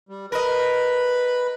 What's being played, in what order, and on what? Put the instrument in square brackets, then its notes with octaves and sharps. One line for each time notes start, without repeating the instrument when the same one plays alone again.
[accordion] G3
[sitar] A#4 D#5 [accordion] B4 B5